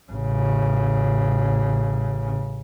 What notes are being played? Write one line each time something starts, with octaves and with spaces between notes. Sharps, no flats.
A1 C#3